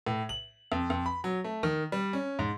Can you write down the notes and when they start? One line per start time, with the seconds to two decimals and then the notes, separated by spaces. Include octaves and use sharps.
0.07 A2
0.29 F#7
0.72 F2
0.90 F2
1.06 B5
1.24 F#3
1.44 A3
1.63 D#3
1.92 G3
2.13 C#4
2.39 G#2